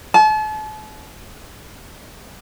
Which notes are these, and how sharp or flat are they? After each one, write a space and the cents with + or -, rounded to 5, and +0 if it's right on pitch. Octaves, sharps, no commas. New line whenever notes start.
A5 -40